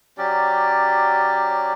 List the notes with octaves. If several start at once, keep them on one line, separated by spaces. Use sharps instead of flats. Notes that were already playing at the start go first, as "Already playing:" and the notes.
F#3 C#4 G4 D5